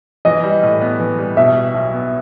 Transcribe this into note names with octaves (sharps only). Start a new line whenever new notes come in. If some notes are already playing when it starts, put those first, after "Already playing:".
E3 D#5
G3
A2
B3
E3
G3
B2 E5
G3
B1
B3